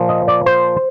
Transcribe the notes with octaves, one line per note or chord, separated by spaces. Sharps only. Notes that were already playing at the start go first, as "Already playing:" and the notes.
Already playing: A#2 F3
D#5
D5
C5